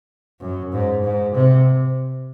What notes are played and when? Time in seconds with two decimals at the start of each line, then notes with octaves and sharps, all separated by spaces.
0.40 F#2
0.73 G#2
1.04 G#2
1.35 C3